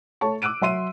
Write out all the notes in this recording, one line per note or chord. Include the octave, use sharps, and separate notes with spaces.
A3 C#5 A5 C#6
D6 E6 F#6 D7 D#7
F#3 E5 C6 D#7